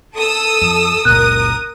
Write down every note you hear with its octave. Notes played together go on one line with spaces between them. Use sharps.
A4 D#6 E6
F2
F#1 C#2 A#2 A#4 D#6 F#6